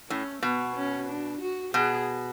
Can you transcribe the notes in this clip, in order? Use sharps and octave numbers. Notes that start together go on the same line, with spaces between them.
A2 C#4
B2 B3
C#4
D4
F#4
B2 G#4